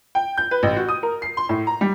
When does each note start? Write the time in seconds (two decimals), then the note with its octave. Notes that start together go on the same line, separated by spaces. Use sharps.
0.15 G5
0.37 G6
0.51 B4
0.63 A1
0.77 F#4
0.89 D#6
1.03 A#4
1.22 C7
1.37 C6
1.49 A2
1.67 A#5
1.81 G3